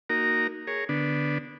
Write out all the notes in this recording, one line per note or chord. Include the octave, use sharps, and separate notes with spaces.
A#3 D#4 F#4 A#4 A#5
G#4 A#4 C#5
D3 B3 D4